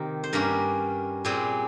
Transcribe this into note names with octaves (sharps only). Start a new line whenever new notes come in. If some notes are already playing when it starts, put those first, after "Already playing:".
Already playing: C3 D#3 A#3 G4
C5
G2 G3 A#3 C#4 A#4
A#2 G3 C4 G#4